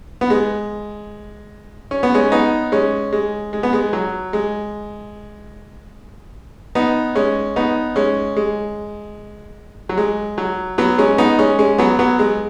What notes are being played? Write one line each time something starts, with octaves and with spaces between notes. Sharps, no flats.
B3
G#3
C#4
B3
G#3 C#4
B3 D#4
G#3 C#4
G#3
G#3
B3
G#3
F#3
G#3
B3 D#4
G#3 C#4
B3 D#4
G#3 C#4
G#3
F#3
G#3
F#3
F#3 B3
G#3 C#4
B3 D#4
G#3 C#4
G#3 C#4
F#3 B3
F#3 B3
G#3